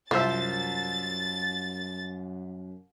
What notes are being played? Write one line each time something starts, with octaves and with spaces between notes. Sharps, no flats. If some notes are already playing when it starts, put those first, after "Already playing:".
C2 F#2 F3 C5 E5 A6